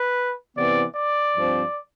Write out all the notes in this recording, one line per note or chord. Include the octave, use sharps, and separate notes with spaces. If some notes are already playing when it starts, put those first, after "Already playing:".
Already playing: B4
C3 E3 B3 D5
D5
G2 F3 C4